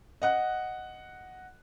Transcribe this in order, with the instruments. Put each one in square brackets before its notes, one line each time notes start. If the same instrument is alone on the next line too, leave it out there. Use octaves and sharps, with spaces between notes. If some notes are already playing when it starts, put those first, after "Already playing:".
[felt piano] D#5 F#5 F#6